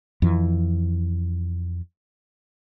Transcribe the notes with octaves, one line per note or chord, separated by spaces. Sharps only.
F2 E3